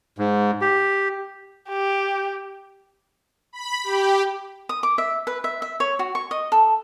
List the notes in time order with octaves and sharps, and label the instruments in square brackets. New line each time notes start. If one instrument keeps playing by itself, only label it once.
[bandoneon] G#2
G4
[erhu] G4
[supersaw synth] B5
G4
[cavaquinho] D#6
D6
E5
B4
E5
E5
C#5
F#4
C#6
D#5
A4